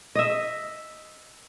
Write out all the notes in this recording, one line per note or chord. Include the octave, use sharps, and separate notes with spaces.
D#5 E5